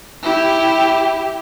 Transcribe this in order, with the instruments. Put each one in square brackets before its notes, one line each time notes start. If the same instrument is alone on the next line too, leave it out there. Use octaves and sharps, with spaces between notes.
[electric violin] E4 G4